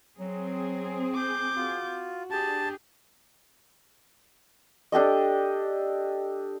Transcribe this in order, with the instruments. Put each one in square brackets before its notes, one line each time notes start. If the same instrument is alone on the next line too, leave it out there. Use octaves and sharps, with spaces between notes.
[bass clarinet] F#3 [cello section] C4 G#4
[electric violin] D6 G6
[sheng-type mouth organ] F4 [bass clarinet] F#4
[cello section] D4 G#4 [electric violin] G4 [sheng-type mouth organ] A5
[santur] D4 G4 A4 D#5